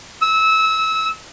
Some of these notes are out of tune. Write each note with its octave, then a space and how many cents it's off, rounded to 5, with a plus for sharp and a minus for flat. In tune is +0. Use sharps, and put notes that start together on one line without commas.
E6 -25